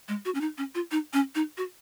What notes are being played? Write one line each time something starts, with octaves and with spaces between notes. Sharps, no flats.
G#3
F#4
C#4
D#4
C#4
F4
D#4
C#4
D#4
F#4